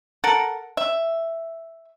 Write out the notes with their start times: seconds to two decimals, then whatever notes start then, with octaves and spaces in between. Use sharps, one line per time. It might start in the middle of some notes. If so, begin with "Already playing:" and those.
0.24 A4 A#4 F#5
0.77 E5